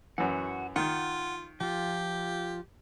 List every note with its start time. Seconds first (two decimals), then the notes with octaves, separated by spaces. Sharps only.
0.18 F#2 E3 F#4 F#5
0.76 D#3 F4 F#5 G6
1.61 F3 F4 G4